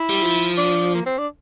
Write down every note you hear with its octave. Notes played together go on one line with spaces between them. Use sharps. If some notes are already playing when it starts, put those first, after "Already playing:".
Already playing: E4
G3
F3
D4
A#3
C4
D4